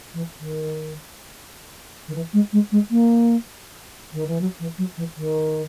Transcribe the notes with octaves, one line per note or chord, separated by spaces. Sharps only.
E3
D#3
D#3
E3
G#3
G#3
G#3
A#3
D#3
E3
F#3
E3
F#3
E3
D#3